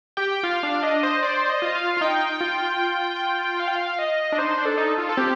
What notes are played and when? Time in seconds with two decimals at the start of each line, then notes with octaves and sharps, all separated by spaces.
0.17 G4 G5
0.43 F4 F5
0.63 D4
0.83 D4 D#5
1.03 C5
1.23 C5 D5
1.50 D#5
1.62 F4
1.75 F5
1.97 F4
2.01 D#4 G5
2.41 F4
3.60 F5
3.68 G5
3.75 F5
3.99 D#5
4.32 D4
4.38 D#4 C5
4.58 D4
4.65 A4
4.77 D#4
4.98 F4
5.09 A4
5.17 C4 G4